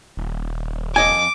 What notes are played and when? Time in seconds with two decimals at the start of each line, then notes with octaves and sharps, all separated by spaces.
0.17 D#1
0.96 F2 D#5 G#5 D6